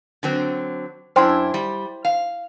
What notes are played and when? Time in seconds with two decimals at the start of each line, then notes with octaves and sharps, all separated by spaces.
0.23 D3 F#3 C4
1.16 F#2 D4 E4 C5 G5 C6
1.54 G3
2.05 F5